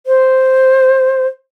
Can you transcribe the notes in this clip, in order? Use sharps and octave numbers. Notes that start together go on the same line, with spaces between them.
C5